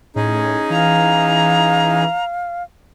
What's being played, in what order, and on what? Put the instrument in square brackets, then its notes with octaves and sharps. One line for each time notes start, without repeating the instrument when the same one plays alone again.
[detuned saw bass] A2 [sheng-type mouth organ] C#4 D#4 G#4
[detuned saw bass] E3 [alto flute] F5 [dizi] A#5